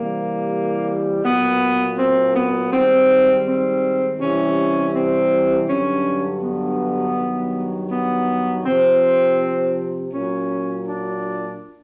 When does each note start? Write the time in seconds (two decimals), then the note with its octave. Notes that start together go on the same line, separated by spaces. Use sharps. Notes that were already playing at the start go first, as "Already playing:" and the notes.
Already playing: C3 E3 G3 A#3
1.23 A#2 F#3 B3
1.98 C4
2.35 B3
2.71 G#2 D#3 G3 C4
3.46 C4
4.20 C3 E3 G3 C#4
4.95 C4
5.68 G2 D3 F#3 C#4
6.43 B3
7.16 G2 D#3 F#3
7.91 B3
8.65 C3 F3 C4
10.12 A#2 F#3 C#4
10.87 D4